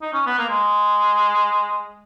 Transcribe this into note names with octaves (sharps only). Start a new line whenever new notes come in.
D#4
C#4
B3
A#3
G#3